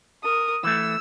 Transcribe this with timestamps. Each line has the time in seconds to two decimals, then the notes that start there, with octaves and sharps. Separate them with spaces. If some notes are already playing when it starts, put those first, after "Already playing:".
0.23 A#4 D#6
0.64 E3 A3 E6